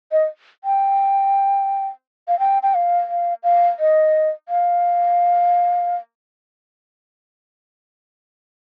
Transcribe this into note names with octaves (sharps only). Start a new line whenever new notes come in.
D#5
G5
F5
G5
G5
F5
F5
F5
D#5
F5